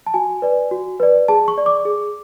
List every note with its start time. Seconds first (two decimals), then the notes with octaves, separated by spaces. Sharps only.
0.06 A5
0.14 F#4 G#5
0.42 B4 D5
0.71 F#4
1.00 B4 D5
1.28 G#4 A5
1.48 C#6
1.58 D5
1.66 D6
1.85 G#4